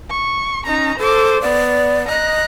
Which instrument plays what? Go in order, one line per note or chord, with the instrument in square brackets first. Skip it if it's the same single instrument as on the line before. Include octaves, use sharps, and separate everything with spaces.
[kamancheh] C#6
[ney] C#4 [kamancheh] D#4 A#5
[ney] A4 [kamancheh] C5 D6
[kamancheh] B3 [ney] D5
[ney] D#5 [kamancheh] A#5 F#6